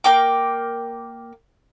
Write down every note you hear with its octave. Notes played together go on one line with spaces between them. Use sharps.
A#3 G5 D6